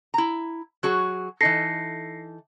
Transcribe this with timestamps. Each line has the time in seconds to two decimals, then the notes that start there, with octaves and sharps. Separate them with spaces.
0.14 E4 A#5
0.83 F#3 F#4 G#4
1.41 E3 D#4 A4 A#6 C7 C#7